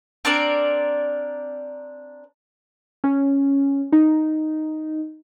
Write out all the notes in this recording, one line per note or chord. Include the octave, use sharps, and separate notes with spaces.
C4 D4 A#4 D5
C#4
D#4